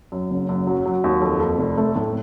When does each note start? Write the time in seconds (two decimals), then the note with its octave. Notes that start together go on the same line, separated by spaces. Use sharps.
0.12 F#2
0.30 F#1
0.49 F#2
0.67 F#3
0.86 F#3
1.04 D#2
1.22 F2
1.40 F2
1.59 F1
1.77 A3
1.96 A2